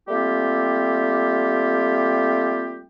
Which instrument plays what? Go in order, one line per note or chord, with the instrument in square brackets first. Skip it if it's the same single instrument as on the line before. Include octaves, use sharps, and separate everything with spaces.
[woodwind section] G3 A3 A#3 C4 F4 G4